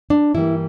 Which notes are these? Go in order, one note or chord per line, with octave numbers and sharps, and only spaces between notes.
D4
G2 E3 G3 A#3 E4